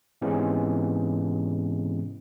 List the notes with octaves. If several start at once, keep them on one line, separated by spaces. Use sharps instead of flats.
G#2 C3 E3 G#3 B3 C#4